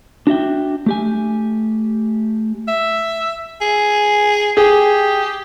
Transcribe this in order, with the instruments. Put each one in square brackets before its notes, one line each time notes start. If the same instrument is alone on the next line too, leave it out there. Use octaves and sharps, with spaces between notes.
[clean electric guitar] D4 F#4 E5 G5
A3 G4 G#5
[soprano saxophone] E5
G#4
[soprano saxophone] G4 [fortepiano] G#4